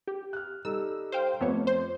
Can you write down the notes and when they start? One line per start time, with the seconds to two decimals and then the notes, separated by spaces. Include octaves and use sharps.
0.07 G4
0.33 F6 F#6
0.65 G3 D#4 A4 E6
1.12 C5 F5 G5
1.40 F2 A3 B3 C#5
1.67 C5